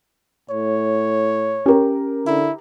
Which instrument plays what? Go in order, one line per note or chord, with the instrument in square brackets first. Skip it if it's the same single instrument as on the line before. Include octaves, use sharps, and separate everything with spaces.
[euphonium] A2 [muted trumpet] C#5
[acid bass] C#4 [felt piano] G4 A#4
[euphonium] D3 [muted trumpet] E4